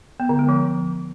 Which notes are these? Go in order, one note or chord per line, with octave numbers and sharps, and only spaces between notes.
B3
D3
G#3
F3